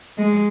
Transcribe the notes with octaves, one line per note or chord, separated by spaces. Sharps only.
G#3